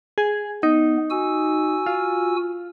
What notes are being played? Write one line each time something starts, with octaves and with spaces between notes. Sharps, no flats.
G#4
B3 D#4
F#4 G#5 E6
F4